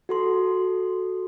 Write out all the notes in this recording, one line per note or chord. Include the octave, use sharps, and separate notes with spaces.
F#4 A4 C6